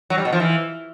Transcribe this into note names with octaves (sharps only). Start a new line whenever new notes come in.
F#3
G3
B2
F3
E3